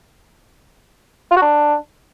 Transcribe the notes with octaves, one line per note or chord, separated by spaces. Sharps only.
F4
F#4
D4